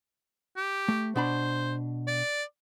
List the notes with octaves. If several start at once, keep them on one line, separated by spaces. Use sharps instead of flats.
G4
A3
B2 D4 C5 B5
D5